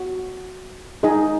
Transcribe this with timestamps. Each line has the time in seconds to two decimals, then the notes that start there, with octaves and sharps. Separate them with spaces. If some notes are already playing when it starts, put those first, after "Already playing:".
Already playing: F#4
1.03 D#4 G#4 D#5